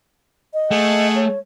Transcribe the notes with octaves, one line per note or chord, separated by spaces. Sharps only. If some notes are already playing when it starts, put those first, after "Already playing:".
D#5
A3 G#4 F#5
C#5